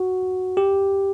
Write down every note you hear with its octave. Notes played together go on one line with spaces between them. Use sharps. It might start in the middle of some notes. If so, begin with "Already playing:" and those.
Already playing: F#4
G4